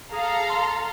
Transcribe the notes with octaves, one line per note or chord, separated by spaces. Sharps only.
G#4 A4 F5 A#5
C6